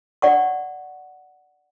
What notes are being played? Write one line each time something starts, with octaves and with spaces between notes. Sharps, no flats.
D5 F#5 C#6